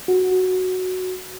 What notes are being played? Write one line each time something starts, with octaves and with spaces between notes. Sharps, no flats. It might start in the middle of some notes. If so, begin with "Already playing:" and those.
F#4